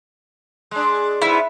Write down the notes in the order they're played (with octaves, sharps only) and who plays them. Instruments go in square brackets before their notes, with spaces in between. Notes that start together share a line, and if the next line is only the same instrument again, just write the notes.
[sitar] G#3 D4
[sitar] G#2 B3 [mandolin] E4